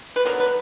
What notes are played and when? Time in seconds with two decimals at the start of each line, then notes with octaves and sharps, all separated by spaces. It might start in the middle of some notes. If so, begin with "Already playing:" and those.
0.16 B4
0.25 D3 F#3 B3 A#4
0.40 B4